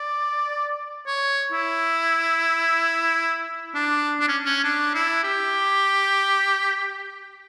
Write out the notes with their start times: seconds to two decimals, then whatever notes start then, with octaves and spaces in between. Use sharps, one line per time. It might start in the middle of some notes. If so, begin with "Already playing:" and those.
Already playing: D5
1.07 C#5
1.52 E4
3.75 D4
4.20 D4
4.28 C#4
4.46 C#4
4.64 D4
4.94 E4
5.24 G4